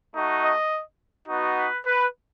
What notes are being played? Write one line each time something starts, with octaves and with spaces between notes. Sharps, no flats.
A3 D#4 F#4
D#5
B3 D#4 F#4
B4
B4